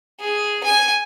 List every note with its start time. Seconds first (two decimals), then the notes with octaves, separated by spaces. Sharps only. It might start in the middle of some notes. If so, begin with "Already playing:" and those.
0.21 G#4
0.64 G#5